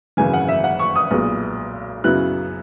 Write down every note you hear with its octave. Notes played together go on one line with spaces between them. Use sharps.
G#1 F#2 C#3 E3 G#5
F#5
E5
F#5
C#6
D#6
B1 A#2 G#3 B3
F#2 C#3 F#3 B3 E4 F#6